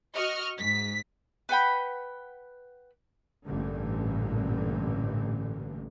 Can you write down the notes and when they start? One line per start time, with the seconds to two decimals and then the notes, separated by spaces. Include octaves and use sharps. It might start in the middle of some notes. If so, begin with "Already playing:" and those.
0.15 F#4 D#5 C#6 F6
0.58 G#2 B6
1.49 B4 F#5 G5 B5
3.46 A1 G2 A#2 D3